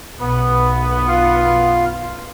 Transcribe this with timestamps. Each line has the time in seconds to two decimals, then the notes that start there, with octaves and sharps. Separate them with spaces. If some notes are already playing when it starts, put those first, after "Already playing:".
0.19 B1 F#2 B3
1.08 F4